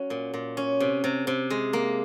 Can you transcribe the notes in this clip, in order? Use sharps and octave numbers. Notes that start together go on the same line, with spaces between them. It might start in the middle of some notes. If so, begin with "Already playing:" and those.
Already playing: F#3 C#4
A#2
A#2
C#4
C3
C3
C3
G#3
A#3